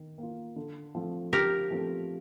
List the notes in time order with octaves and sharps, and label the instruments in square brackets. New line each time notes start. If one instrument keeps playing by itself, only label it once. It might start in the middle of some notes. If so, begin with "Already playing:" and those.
Already playing: [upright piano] D#3
A#3 F4
D3
F3 A3 C4 F4
[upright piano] D3 [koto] G4 A#4
[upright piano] F3 A3 C4 F4